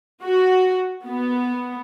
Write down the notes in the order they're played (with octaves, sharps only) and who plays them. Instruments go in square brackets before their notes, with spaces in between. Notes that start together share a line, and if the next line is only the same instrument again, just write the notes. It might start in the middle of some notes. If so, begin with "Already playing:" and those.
[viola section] F#4
B3